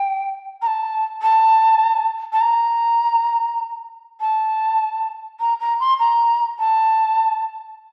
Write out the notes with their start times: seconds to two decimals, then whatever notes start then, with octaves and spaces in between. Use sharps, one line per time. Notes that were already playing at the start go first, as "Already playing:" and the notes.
Already playing: G5
0.62 A#5
0.67 A5
1.22 A5
2.33 A5
2.41 A#5
4.21 A5
5.40 A#5
5.60 A#5
5.80 C6
5.99 A#5
6.59 A5